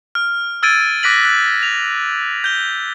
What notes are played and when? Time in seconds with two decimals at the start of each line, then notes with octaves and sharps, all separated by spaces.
0.15 F6
0.63 E6 F6 G#6 A6 D7 D#7
1.03 D6 F#6 A#6 B6 D7 F#7
1.25 F#6
1.63 F7
2.44 G6 G7